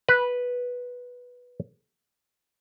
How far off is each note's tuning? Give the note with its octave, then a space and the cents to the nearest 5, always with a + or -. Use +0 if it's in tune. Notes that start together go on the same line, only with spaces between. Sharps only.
B4 -5